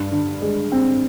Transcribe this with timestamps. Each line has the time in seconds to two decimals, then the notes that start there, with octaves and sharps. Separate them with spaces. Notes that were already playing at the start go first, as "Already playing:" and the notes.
Already playing: G2
0.11 D3
0.42 G#3
0.72 C4